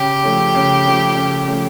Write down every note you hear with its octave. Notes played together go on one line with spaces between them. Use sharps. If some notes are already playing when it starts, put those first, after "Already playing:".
Already playing: C#3 G4
F3 A3 C#4
C#3
F3 A3 C#4
C#3
F3 A3 C#4